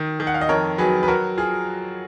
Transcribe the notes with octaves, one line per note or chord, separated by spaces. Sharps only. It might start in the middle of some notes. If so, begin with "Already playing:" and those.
Already playing: D#3
D#3
F#5
F5
D#5
F2 A#4 C#5
F#3 G#4 B4
B4
F#3 F#4 A#4
F4 G#4